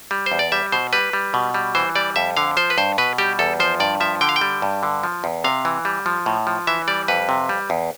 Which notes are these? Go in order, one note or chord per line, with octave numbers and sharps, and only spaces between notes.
G3
C5
E2
D5
G3 E5
B2 C5
G3 B4
G3
B2
G3
E3 C5
G3 D5
F2 E5
D3 F5
F3 C5
B4
G2 C5
B2 B4
G3 G4
E2 A4
F3 C5
G2 D5
F3 E5
D3 G5
F5
G5
G3
G2
D3
F3
E2
C3 F5
E3
G3
F3
A2
F3
E3 E5
G3 D5
F2 B4
C3
G3
E2